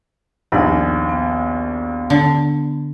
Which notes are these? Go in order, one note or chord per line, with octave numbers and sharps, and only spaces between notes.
A#1 D#2 B3 D#4
B3
D3